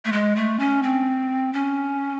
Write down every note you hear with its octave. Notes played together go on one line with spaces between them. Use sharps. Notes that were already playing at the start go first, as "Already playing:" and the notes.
A3
G#3
A3
C#4
C4
C#4